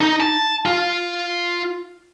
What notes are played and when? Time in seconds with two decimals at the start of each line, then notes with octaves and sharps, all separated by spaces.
0.01 D#4
0.20 A5
0.66 F4